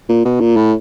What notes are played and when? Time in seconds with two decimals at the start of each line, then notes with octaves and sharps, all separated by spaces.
0.09 A#2
0.25 B2
0.40 A#2
0.56 A2